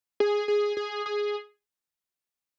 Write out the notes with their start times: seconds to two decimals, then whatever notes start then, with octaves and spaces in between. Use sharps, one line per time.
0.20 G#4
0.48 G#4
0.77 G#4
1.06 G#4